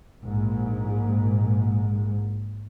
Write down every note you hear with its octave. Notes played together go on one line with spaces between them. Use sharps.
A#1 G#2